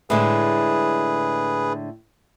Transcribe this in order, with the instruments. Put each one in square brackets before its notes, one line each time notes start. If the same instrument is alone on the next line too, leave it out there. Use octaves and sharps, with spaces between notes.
[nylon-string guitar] A2 D3 G#3 [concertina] G#4 B4